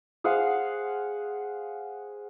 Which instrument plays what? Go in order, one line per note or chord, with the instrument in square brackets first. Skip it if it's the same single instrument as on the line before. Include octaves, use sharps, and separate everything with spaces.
[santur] G#4 C5 F5 F#5